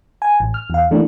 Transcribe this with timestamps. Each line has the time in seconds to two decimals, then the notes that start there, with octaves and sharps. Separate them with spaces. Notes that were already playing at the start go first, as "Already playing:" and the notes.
0.22 G#5
0.40 A1
0.54 F6
0.70 E2 F5
0.91 E3 A3 A#3 D4